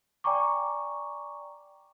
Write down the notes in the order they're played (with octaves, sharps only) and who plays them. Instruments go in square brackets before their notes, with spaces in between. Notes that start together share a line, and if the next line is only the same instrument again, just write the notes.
[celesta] D5 G5 G#5 A#5 C#6 D6